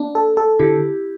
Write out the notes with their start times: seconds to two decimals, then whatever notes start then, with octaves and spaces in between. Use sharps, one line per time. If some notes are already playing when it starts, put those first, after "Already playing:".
Already playing: A#3 D4
0.15 A4
0.37 A4
0.59 D3 E4 G4